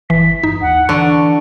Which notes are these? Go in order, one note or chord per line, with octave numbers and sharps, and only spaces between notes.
G1 E3 B6
G2 D#4
D#2 F#5
D3 E3 C#6